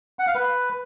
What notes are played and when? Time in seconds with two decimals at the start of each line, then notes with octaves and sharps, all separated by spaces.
0.19 F#5
0.27 F5
0.35 B4